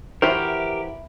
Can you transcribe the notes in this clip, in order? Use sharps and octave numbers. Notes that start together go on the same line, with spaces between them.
E3 E4 F#4 G4 A#4 C5